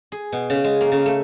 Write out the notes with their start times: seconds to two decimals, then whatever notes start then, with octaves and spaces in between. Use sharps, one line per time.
0.12 G#4
0.32 B2
0.50 C#3
0.64 G#3
0.81 A#3
0.92 C#3
1.06 A3